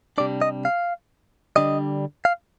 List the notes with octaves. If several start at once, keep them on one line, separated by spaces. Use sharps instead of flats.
C3 G3 D4 D5
D#5
F5
D3 G3 D4 D#5
F5